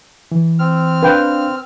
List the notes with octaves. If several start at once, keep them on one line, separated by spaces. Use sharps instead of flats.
E3
C4 F6
D4 B4 F5 G5